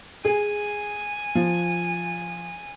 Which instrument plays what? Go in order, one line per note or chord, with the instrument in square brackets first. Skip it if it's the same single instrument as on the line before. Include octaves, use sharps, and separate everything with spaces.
[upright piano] G#4 [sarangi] G#5
[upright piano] F3